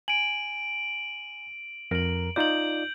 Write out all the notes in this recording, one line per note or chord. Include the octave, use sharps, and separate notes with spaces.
G#5 D7 D#7 F#7
F2 A#4 A#5 D7 F#7
D#4 F4 D5 G6 F#7